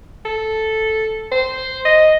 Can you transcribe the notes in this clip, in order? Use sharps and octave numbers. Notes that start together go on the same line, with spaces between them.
A4
C5
D#5